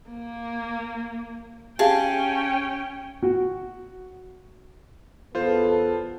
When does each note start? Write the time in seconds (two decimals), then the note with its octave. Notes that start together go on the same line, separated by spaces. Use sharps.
0.10 A#3
1.79 C#4 G4 G#4 F5 G5 A5
3.23 F#4
5.35 E2 B3 F4 A4 C5